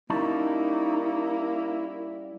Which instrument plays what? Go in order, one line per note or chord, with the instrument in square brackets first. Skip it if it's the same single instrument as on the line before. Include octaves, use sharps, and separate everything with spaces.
[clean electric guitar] G3 C#4 A5 [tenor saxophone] A#3 [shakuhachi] D#4 [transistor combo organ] E4